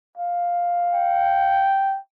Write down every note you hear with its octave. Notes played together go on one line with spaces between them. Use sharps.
F5
G5